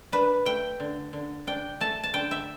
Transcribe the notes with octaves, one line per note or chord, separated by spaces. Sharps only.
D4 B4
A3 G5
D3
D3
D4 G5
A3 A5
A5
D3 G5
E5